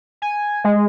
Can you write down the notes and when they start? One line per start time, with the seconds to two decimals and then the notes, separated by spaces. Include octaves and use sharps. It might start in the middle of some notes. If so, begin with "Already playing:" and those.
0.22 G#5
0.64 G#3